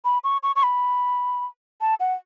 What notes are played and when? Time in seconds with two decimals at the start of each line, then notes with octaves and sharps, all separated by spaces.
0.05 B5
0.24 C#6
0.43 C#6
0.56 C#6
0.63 B5
1.81 A5
2.00 F#5